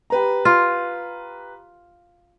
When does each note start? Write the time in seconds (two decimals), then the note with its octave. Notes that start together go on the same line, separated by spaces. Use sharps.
0.10 G4 B4 A#5
0.45 F4